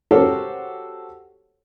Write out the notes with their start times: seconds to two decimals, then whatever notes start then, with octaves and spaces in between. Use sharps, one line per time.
0.11 F#4 G4 A4 A#4 C5 C#5